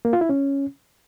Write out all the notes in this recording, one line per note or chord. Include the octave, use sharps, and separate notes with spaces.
A#3
F4
E4
C#4